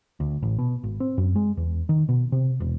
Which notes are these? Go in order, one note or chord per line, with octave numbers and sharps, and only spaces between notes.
D2
A1
B2
G#1
C4
F#2
G#3
E2
D#3
B2
C3
E1